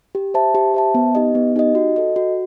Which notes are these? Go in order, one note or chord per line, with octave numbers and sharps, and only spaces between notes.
G4
C5 E5 A5
G4
C5 E5 A5
B3
D#4 G4 D#5
B3
D#4 G4 D#5
F#4
A4 D#5
F#4